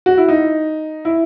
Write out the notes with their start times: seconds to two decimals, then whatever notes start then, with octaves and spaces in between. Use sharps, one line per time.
0.06 F#4
0.17 E4
0.28 D#4
1.05 E4